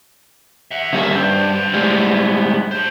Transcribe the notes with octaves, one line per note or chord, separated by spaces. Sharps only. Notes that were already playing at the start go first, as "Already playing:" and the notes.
E5 F#5
C#3 G3 A#3 E5
G2 B3 C5
A2 G3 G#3
D4 C5